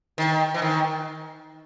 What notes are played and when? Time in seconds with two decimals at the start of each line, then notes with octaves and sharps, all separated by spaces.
0.18 D#3
0.54 E3
0.62 D#3